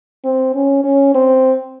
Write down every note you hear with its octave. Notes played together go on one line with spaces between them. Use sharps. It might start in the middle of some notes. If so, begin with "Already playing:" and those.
C4
C#4
C#4
C4